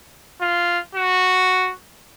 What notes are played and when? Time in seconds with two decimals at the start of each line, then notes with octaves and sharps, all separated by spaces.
0.41 F4
0.95 F#4